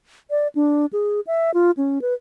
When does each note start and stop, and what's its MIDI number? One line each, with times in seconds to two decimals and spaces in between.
0.30 0.48 74
0.55 0.86 62
0.93 1.20 68
1.27 1.51 76
1.54 1.71 65
1.77 2.01 61
2.02 2.14 71